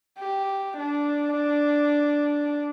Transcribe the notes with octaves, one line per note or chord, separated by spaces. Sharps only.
G4
D4